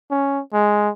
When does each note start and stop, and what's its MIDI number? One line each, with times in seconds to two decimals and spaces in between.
0.11 0.41 61
0.53 0.90 56